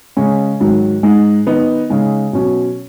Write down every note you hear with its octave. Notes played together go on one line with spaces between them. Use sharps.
C#3 G#3 C#4
G#2 D#3 F#3
G#2 G#3 D#4
D#3 B3 D#4
C#3 G#3 D#4
B2 F#3 C#4